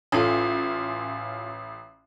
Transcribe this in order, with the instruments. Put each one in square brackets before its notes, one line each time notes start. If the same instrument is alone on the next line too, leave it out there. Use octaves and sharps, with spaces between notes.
[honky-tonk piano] A1 [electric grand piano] C#4 F4 [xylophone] A4 G#5 G#6